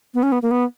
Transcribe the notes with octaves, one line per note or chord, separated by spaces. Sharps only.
B3
C#4
B3
A#3
B3